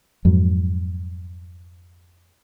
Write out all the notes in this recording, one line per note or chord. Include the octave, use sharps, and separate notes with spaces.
F2 G#2 F#3